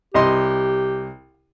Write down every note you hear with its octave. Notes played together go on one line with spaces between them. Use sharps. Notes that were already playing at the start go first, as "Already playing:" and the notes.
C2 G4 D#5 C6